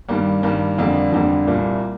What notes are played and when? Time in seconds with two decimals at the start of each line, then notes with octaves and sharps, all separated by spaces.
0.08 G2 D#3 G3 A#3
0.43 G2 D#3 G3 A#3
0.78 F2 D3 G3 A#3 D4
1.12 F2 D3 G3 A#3 D4
1.47 C2 A#2 G3 A#3